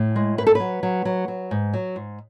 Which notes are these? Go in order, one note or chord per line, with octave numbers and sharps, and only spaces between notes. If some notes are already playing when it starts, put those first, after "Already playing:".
Already playing: A2
G#3
G#2 B4
A4
F#3 B4
F#3
F#3
F#3
G#2
F#3
G#2